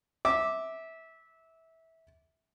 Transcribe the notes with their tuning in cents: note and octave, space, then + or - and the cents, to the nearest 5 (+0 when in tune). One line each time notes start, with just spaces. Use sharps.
E5 -20 D6 +0